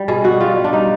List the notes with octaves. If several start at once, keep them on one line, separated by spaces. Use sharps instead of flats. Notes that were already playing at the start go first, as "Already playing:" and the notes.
Already playing: G3
B2 G#4
B2 F#4
G3 F4
G3
D4
G3 D#4